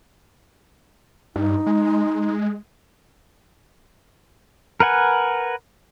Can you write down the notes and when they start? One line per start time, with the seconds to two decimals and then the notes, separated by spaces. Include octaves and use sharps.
1.36 G2 D#4
1.67 G#3
4.80 A#4 B4 F#5 G#5